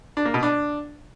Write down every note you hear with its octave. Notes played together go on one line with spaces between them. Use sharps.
D4
A#3
B2
D4